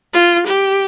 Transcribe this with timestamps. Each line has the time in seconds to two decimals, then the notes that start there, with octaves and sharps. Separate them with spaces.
0.13 F4
0.46 G4